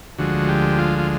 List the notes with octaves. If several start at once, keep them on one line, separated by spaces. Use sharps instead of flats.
D2 D3 F3 G#3 F#4
G4
F4
F4